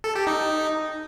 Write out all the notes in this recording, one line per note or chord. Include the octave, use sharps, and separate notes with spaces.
A4
G4
D#4